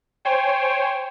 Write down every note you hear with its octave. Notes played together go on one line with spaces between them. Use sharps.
C5 C#5 G5 G#5